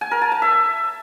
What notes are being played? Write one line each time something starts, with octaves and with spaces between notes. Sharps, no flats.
G#5
A#4
A5
A5
E5